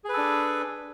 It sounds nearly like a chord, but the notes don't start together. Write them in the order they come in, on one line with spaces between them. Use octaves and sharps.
G#4 B4 A4 D4